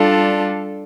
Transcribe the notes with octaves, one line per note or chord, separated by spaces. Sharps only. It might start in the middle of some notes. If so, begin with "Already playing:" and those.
Already playing: G3 D4 F4 A4